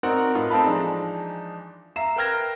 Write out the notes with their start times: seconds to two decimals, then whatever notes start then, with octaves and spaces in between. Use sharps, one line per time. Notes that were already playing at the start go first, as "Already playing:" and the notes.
0.03 C4 D#4 F#4 A#4 D5 F#5
0.35 A2 D#4 F4 A#4 B4
0.50 C4 D#4 A4 F5 A5 B5
0.66 E3 F3 G#3 D4 D#4
1.96 E5 F5 A#5 C7 E7
2.16 A#4 B4 G5 F6 G#6 A#6